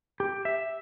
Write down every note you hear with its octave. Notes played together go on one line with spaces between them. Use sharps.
G4
E5